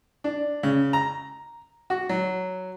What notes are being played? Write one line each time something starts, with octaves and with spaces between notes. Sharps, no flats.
D4
C#3
A#5
F#4
F#3